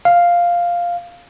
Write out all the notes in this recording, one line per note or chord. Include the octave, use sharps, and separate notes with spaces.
F5